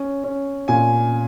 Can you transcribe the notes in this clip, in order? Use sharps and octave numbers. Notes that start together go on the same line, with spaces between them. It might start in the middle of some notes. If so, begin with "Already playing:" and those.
Already playing: C#4
C#4
A#2 G#5